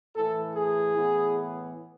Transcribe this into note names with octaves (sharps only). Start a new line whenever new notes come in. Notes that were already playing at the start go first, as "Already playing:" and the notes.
A2 E3 A3 A4
G#4
A2 E3 B3